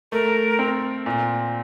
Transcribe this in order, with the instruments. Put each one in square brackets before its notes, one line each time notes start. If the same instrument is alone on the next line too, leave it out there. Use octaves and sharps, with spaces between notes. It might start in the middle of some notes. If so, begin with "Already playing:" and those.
[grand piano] A3 [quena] A#4
[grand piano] C4
A#2